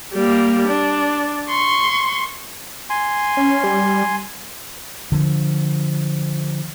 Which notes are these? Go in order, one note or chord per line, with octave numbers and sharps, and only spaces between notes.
G3 A#3
D4
C6 C#6
G#5 C6
C#4
G3
D3 F3